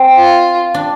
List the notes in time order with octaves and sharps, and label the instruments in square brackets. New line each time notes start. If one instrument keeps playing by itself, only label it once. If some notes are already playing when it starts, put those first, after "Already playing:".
Already playing: [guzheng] C4
[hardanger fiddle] F4
[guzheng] D4